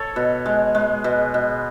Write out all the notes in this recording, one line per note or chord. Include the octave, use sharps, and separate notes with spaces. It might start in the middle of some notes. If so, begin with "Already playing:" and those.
Already playing: A4 C#5
B2
G#3
G#3
B2
B2